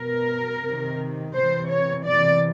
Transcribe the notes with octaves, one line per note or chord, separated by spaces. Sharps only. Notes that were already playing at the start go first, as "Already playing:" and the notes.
Already playing: B2 A#4
C3 D#3
C3 E3 C5
C#5
C3 E3 D5